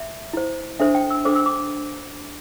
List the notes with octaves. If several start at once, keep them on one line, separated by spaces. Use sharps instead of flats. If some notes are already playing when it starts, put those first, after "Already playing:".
Already playing: E5
E4 C5
D4 A4 C5 E5
G5
E6
D4 A4 C5 D6
E6
D6